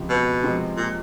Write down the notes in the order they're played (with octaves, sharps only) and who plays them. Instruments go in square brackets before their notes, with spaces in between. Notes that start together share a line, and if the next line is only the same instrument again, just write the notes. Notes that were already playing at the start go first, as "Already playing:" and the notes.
Already playing: [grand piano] C#2 C3 F3
[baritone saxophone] B2
[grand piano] C3 F3 G#3 C4
[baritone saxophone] A#2